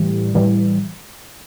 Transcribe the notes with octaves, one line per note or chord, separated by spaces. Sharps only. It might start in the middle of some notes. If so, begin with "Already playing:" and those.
Already playing: A2 E3 G3
A2 E3 G3